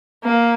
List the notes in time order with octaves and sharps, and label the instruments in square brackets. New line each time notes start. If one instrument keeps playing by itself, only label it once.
[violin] A#3